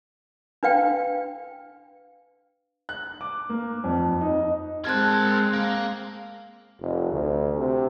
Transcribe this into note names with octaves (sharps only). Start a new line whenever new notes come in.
D4 B4 F5 G5
F#6
D6
A#3
F2
D#4
G#3 C4 A#4 A5 F#6 G#6
A#3
F1
D2
C3